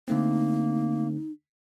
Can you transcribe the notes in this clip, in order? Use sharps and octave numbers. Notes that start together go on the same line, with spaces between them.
D3 A3 A#3 C4 D#4